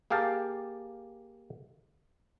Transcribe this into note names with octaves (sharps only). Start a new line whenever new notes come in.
A#3 G4 G#4 F5 G5 A5